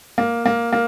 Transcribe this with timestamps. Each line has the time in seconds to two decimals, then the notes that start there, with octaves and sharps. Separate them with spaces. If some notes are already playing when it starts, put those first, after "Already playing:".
0.18 A#3
0.46 A#3
0.73 A#3